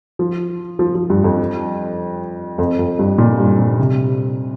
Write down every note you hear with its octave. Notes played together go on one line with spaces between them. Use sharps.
F3
F3
F3
G2
F2
F2
F2
G2
A#2
G2
A#2
C3